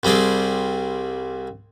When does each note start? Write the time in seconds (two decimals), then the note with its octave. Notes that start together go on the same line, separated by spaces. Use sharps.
0.03 C2 G3 C4 G#4 D5